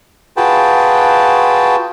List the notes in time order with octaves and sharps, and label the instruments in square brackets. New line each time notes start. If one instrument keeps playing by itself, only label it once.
[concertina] F4 F#4 G#4 B4 G5 A5